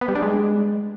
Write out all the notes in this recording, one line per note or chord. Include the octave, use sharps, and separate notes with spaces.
B3
G3
D4
G#3